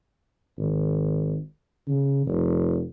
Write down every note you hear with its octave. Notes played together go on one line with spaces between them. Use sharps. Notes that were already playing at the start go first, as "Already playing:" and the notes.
G#1
C#3
F1